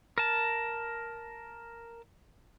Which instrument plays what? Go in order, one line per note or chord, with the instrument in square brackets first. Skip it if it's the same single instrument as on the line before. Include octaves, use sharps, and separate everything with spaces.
[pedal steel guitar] A#4 A5